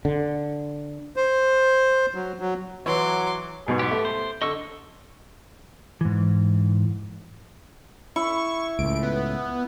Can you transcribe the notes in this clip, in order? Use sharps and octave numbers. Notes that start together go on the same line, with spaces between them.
D3
C5
F#3
F#3
E3 F#3 C#5 C6 D6
G#2 B2 G#4
B3 G4
A3
C5
D3 D#5 C#6 E6
G#2 E3
E4 C#6
C#2 A2 D7
B3